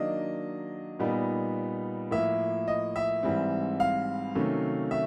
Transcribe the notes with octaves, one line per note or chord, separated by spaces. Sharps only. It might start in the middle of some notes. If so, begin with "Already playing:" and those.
Already playing: D#3 F#3 A#3 D4 D#5
A#2 G3 B3 D#4
A2 F3 A#3 E5
D#5
E5
G#2 E3 G3 C4
F5
C3 D#3 F#3 A3 C#4
E5